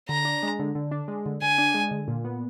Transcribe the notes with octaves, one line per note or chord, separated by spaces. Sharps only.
D3 A#5
D4
G#3
D3
D3
D4
G#3
D3
D3 G#5
D4
G#3
D3
A#2
B3